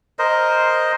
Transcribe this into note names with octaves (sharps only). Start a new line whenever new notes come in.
A#4 C5 D#5